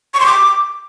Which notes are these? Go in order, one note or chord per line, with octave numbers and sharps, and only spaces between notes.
C#6
C6
D6